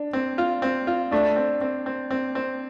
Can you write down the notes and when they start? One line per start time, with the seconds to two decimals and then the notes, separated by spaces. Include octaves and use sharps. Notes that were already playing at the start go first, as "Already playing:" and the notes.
Already playing: D4
0.13 C4
0.38 F4
0.62 C4
0.87 F4
1.11 A3 D4
1.36 C4
1.61 C4
1.86 C4
2.10 C4
2.35 C4